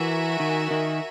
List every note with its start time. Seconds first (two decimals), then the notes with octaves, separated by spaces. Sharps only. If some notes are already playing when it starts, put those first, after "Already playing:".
Already playing: E3 F#4 A#4 E5 G#5
0.40 D#3
0.71 D#3